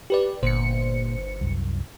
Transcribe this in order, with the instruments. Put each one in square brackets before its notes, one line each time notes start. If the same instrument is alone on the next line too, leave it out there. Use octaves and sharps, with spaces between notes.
[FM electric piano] G4 B4 D5
[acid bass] G1 [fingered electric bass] A#2 [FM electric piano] C5 C#7
[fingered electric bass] C2 F#2